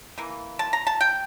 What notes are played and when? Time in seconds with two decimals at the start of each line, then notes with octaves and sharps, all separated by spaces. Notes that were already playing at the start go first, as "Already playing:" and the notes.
0.18 E3 A#3
0.59 A5
0.73 A#5
0.87 A5
1.01 G5